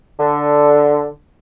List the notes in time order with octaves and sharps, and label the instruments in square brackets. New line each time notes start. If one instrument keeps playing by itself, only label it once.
[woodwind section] D3